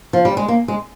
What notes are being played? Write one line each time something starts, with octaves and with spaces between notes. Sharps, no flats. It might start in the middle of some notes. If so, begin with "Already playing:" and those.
F3
G3
G#3
A#3
G#3